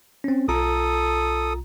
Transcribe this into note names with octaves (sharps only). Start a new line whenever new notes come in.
C4 C#4
B1 F4 A4 A#5 D#6